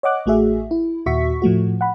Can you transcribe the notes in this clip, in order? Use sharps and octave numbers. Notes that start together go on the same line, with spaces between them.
C#5 D#5 F#5 D6 F#6
A1 A3 F#4 G#4 E5
E4
D#2 A#2 F#4 E5 C#6 B6
A2 F3 A3 F#4
F#5 B5